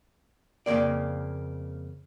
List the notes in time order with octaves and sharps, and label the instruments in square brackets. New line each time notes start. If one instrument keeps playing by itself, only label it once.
[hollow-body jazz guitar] F2 C#3 A3 A#3 D5